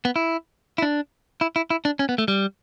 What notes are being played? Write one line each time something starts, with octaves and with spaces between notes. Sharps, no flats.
B3
E4
E4
D4
E4
E4
E4
D4
C#4
B3
A3
G3